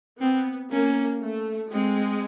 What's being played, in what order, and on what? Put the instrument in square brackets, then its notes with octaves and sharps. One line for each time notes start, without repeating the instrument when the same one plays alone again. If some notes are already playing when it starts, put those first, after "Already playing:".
[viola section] B3 [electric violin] C4
[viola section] A#3 [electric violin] C#4
[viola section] A3
[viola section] G#3 [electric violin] C4